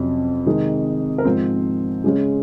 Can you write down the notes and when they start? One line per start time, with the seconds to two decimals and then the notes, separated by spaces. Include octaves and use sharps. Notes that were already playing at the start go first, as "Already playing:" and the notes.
Already playing: F2 C3 F#3 C#4
0.46 C3 D#3 G#3 D#4
1.18 A#4
1.25 G#2 F3 C4 C5
2.04 C#3 G#3 C#4